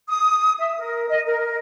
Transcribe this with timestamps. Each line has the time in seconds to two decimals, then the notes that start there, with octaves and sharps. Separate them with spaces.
0.09 D#6
0.59 E5
0.78 A#4
1.10 D#5
1.26 A#4